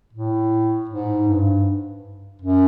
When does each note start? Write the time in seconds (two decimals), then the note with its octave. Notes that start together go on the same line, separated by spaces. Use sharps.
0.13 A2
0.89 G#2
1.28 G2
2.42 F#2